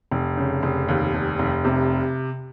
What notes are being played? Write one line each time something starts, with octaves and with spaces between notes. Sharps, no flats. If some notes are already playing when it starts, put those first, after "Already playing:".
F1
C#3
F1
D#2
F1
F1
C3